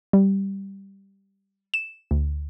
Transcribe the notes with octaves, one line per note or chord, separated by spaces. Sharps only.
G3
E7
D2